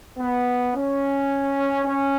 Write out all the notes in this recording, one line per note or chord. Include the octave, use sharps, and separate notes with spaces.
B3
C#4
C#4